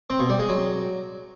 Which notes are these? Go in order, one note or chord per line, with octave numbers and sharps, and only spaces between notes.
C4
B2
G3
G#3
F#3